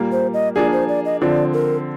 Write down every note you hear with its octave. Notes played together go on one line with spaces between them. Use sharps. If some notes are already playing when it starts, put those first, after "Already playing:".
Already playing: A#2 G3 A#3
C5
D#5
F3 A#3 D4 G#4 D5
C5
D5
D#5
D3 F3 C4 D5
A#4